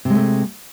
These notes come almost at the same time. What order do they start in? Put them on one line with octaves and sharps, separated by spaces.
C3 G#3 A3